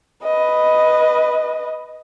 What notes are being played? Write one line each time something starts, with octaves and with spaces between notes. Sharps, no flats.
B4 D#5